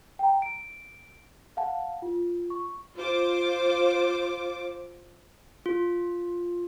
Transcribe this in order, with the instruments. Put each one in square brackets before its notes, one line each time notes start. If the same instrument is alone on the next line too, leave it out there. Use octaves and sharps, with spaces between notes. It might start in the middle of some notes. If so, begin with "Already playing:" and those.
[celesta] G5 A#5
D7
F5 F#5 A5
F4
C#6
[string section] F4 C5 D6
[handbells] F4